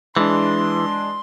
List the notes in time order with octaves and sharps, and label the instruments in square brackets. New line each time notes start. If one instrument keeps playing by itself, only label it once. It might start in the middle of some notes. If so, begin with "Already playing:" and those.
[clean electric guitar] E3 [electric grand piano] G#3 D4 [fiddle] C6